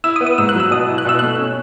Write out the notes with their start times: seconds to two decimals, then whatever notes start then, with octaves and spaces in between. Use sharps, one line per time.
0.04 E4 E6
0.16 D#6
0.21 B3
0.26 D#6
0.38 G#2 E6
0.49 F#6
0.55 F#3
0.60 E6
0.71 B2 D#6
0.88 E4
0.98 F#6
1.06 B2 E6
1.19 A3 F#6
1.39 C#4